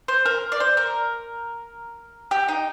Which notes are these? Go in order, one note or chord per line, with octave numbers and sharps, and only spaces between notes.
C5
A#4
D5
C5
A#4
G4
D#4